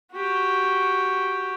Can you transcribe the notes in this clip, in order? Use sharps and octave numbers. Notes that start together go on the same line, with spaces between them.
F#4 G4